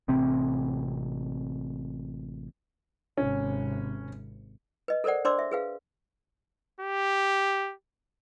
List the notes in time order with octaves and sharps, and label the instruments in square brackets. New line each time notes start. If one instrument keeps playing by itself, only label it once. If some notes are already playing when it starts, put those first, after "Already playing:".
[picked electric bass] A1 C3 C4
[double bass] G#1 C3 [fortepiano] C#4
[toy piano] B4 D#5
A4 A#4 C5 D5 F#5
D4 C5 D5 C6 D6 E6
E5
G#4 B4 F5
[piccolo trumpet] G4